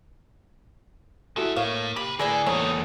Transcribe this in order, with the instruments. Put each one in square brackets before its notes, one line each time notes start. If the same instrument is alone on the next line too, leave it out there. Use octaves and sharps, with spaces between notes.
[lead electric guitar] G#3 E5 [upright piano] E4 F#4 A4
[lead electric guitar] A2 [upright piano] A#3 [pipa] C#5 F5
[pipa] G4 [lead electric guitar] C5 B5
[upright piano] A2 D5 [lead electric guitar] D3 [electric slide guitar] G#4 [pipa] A#4 B4 G#5
[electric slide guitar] E2 A#3 A4 [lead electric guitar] A3 D#4 [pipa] C#5